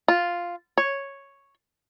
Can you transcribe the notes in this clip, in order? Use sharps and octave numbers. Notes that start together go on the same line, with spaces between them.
F4
C#5